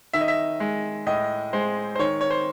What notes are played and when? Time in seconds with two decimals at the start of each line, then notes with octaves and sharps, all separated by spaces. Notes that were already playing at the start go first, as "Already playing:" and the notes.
0.13 D#3 E5
0.21 D#5
0.28 E5
0.60 G#3
1.06 A2 D#5
1.53 G#3 C5
1.96 C5
1.99 D#3 C#5
2.21 C#5
2.31 C5